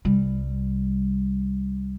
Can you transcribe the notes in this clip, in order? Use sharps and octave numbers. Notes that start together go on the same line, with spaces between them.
C2 G3